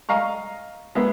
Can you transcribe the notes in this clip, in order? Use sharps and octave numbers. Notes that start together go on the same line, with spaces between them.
D#5 F5 A#5 C#6
G#3 A#3 B3 E5